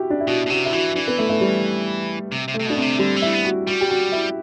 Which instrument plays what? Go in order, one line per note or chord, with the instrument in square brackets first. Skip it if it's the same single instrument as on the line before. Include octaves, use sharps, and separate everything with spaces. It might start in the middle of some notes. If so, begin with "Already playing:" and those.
Already playing: [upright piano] E4 F#4 G4
D4
E4
[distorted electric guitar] B2 [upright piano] F#4
[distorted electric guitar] B2
[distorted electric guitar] C3 [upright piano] F#4
[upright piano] E4
[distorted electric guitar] E3 [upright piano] F#4
[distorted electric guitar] E3 [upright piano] D4
[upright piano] B3
A3
A3
G3
[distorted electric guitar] C3
C3
[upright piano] A3
[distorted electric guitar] C3
[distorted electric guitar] B2 [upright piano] D4
[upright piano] C4
[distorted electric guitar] C3
[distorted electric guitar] D3 [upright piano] G3
[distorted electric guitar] E3
[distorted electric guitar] A3 [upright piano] E4
[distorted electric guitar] B3
[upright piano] F#4
[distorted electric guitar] G3 [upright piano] F#4
[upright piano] G4
F#4
E4